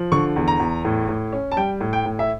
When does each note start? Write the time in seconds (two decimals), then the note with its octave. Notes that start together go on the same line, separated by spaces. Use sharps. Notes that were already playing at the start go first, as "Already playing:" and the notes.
Already playing: F3
0.12 D3 C#6
0.36 E2
0.48 A#5
0.60 E2
0.85 A2
1.09 A2
1.33 C#4
1.52 A5
1.57 G3 G5
1.81 A2
1.93 G5
2.06 A2
2.19 E5